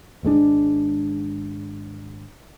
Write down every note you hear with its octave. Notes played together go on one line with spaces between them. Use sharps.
G#1 G#2 G#3 D4